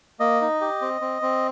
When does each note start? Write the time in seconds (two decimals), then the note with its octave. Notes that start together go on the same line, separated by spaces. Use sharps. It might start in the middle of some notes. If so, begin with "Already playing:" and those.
0.20 A#3 D#5
0.41 D#4
0.61 G4
0.81 C4
1.01 C4
1.22 C4